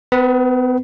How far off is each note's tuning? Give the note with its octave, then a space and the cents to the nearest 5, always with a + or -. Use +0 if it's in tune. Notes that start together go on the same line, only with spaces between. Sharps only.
B3 +40 B4 -20